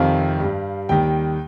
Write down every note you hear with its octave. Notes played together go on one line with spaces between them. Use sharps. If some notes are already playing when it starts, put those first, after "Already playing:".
Already playing: F2 C3 D#3 G3 F5
G2
G3
D#2 D#3 G3 G5